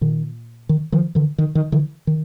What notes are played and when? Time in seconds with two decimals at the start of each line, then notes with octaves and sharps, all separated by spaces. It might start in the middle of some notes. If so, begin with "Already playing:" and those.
0.01 A#2 D#3
0.69 D#3
0.92 D#3 F3
1.15 D3 E3
1.38 D#3
1.55 D#3
1.72 D3 E3
2.07 D#3